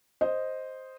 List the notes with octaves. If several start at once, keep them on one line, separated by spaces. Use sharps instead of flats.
C5 D#5